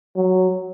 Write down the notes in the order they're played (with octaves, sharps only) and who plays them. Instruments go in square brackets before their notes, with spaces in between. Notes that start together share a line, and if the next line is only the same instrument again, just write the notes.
[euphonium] F#3